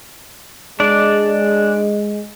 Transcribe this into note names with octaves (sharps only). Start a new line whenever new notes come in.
G#3 D4 D5